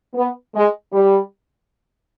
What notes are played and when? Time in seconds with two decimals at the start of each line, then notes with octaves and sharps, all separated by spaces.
0.15 B3
0.55 G#3
0.93 G3